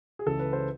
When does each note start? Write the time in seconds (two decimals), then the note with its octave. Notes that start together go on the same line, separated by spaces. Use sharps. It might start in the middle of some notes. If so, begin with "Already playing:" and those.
0.19 G#4
0.26 C#2 C#3 E3 A4
0.39 B4
0.53 C5